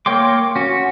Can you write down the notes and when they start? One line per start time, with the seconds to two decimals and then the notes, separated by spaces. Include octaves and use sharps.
0.06 A#3 C#5 G5 C6 D6
0.56 C#4 F#4